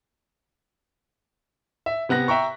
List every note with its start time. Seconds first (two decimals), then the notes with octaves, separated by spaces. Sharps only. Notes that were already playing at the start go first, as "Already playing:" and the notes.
1.86 E5
2.09 C3 B3 F#6 A#6
2.28 E5 G5 A#5 C#6